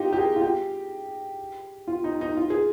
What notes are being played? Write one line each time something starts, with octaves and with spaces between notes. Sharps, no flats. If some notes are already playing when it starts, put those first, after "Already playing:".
Already playing: D#4 F4 G4
G4
G#4
F4
G4
F4
D#4
D#4
F4
G#4